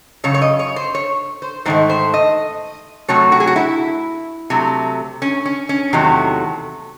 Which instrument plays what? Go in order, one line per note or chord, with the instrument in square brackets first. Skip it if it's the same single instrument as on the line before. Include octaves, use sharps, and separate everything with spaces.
[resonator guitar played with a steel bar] F#2 C#3 C#5
C#5
D#5
C#5
C5
C#5
C5
G#2 D#3 A3 C5
C5
D#5
C3 F#3 A3 C#5
F#4
G#4
F#4
E4
C3 F#3 A3
C#4
C#4
C#4
E2 C3 D#3 F#3 A3